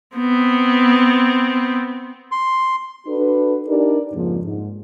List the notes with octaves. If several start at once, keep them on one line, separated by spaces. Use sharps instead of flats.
B3 C4
C6
D4 F#4 A4 B4
D4 D#4 G4 A#4 D5
F2 G#2 C#3 F3 A#3
G#2